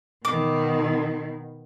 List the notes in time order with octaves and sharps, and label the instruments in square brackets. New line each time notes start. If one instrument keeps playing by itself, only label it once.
[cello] B2 D#3 [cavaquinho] D6